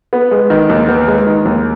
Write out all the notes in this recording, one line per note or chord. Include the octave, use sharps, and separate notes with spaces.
B3
G#3
D#3
D#2
B3
G#3
D#3
D#2